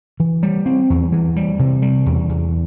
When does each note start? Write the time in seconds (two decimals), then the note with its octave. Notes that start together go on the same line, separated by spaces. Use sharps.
0.20 E3
0.43 G3
0.66 C4
0.90 E2
1.12 E3
1.36 G3
1.59 C3
1.82 G3
2.06 E2
2.29 E2